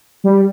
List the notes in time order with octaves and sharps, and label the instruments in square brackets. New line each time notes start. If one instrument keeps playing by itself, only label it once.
[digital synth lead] G3